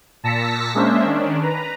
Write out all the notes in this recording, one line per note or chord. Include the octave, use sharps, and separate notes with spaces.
A#2 A5 E6 A#6 B6 C#7
G#3 A#3 C#4 D4 C5 E5
D#3 C#4 D4
B4 A#5